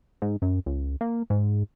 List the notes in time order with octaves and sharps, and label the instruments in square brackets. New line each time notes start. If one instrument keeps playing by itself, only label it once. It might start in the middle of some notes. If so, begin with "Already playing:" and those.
[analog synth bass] G#2
F#2
C#2
A#3
G#2